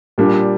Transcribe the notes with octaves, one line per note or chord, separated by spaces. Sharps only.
A#2 G3 D4